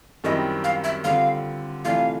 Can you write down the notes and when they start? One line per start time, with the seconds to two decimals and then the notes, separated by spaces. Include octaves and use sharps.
0.24 F#2 D#3 G3 C4 E4 D#5
0.64 F5
0.84 E5
1.04 D3 G3 C4 F4 F5
1.85 C3 E3 A3 D4 F4 F5